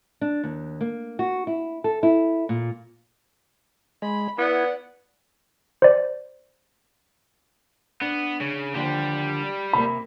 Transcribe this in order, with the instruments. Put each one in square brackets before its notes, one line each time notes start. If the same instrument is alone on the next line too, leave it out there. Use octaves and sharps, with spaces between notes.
[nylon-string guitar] D4
D#2
A#3
F#4
E4
A4
E4
A#2
[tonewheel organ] G#3 [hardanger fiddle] B5
[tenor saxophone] B3 [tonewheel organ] E4 [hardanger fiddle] D5 F#5
[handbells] C5 D5
[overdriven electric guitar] B3 [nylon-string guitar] D4
[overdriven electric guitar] C#3
[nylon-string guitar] D#2 D3 F3 [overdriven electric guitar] G3 G4
[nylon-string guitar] C3 A#3 [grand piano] B5